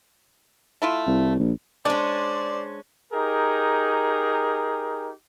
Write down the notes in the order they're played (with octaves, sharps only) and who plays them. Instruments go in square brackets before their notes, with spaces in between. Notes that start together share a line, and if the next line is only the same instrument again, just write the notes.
[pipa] A3 E4 F4
[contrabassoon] C2
A#1
[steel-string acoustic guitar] G#3 C#4 [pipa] D4 [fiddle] C5 C6 [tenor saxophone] D5
[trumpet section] D#4 G4 G#4 A#4